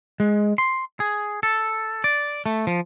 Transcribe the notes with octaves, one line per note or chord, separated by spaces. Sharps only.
G#3
C6
G#4
A4
D5
A3
F3